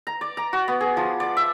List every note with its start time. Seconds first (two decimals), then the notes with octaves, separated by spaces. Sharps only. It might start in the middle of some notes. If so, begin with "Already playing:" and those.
0.07 A#5
0.21 D5
0.37 A#5
0.53 F#4
0.68 B3
0.81 G#4
0.97 F3
1.20 D5
1.37 E5